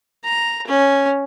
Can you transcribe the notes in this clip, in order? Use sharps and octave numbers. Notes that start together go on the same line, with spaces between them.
A#5
C#4